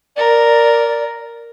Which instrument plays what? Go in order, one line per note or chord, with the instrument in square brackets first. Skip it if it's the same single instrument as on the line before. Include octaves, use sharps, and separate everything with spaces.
[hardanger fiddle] A#4 [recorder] D5